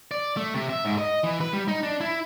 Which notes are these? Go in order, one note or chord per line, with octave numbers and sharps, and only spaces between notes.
D5
A3
C3
E5
G#2
D#5
E3
B4
G3
D#4
D4
E4